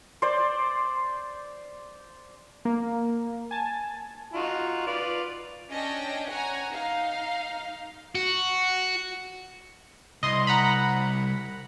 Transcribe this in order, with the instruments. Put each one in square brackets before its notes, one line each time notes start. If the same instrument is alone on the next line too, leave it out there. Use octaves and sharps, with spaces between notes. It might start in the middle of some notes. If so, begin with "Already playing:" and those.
[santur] C5 D5
[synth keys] A#3
G#5 A5
[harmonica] D#4 F4 F#4
F4 B4 D5
[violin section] C#4 D4 D#5 G5
C#5 F#5 G#5 A#5
D#4 F5
[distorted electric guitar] F#4
[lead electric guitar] C2 [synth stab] D#5 C6
[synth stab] F#5 A#5 B5